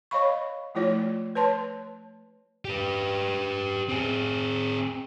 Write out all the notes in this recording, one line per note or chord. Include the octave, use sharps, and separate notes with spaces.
C#5 D#5 F5 B5 C#6
F3 A3 E4 F4 C#5 D5
B4 C#5 A5 C6
G4 B4
C4 G#4